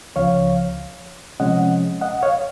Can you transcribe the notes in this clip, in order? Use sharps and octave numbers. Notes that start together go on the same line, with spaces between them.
C#2 C#3 F3 C#5 F5
C3 F3 G#3 C#4 D#5 F#5
D#5 F#5
C#5 F5